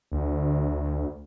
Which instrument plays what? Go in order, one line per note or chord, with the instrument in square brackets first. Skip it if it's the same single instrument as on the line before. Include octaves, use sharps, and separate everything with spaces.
[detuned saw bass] D2